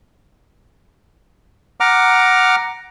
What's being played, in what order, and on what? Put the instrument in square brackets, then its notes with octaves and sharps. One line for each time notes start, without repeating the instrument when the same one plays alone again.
[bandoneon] F#5 A#5 D6 F6